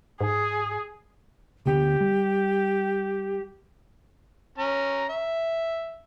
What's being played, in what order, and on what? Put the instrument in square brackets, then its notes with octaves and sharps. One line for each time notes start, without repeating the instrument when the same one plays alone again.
[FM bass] G#2 [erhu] G#4
[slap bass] D2 D3 B3 [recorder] G4
[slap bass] G3
[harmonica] C#4 A#5
E5